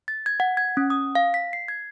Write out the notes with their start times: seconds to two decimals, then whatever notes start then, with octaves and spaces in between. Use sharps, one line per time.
0.08 A6
0.26 G#6
0.40 F#5
0.57 G#6
0.77 C#4
0.90 D#6
1.15 F5
1.34 B6
1.53 C7
1.68 G#6